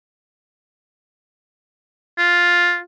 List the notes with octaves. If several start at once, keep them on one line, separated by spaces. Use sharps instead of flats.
F4